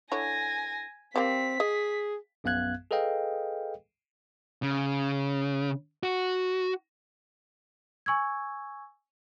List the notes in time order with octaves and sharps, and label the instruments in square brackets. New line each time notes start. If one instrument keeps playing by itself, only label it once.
[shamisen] D3 E4 C#5 [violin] G#5 A#6
[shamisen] G3 A#3 [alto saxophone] C4 [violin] B6
[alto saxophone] G#4 [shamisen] D#5
[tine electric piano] A#1 F#2 B3 F5 F#6 G#6
G#4 A4 B4 D#5 F5 G5
[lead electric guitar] C#3
F#4
[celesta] G#5 C#6 E6 G#6